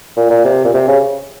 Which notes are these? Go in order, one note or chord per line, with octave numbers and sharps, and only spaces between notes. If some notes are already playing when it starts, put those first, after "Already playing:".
A#2
A#2
C3
A#2
C3
C#3